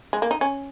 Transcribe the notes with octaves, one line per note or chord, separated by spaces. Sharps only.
G#3
A#3
D#4
C#4